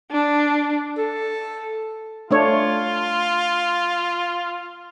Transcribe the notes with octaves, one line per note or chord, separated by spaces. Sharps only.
D4
A4
A3 D4 F4 C#5